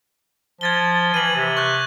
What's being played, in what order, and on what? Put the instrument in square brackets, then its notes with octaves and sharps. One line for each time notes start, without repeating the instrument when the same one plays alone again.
[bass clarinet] F3 [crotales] G#6 A6 G7
[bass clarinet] E3 [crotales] D#7 F#7
[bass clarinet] C3
[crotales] C#6 F#6 G6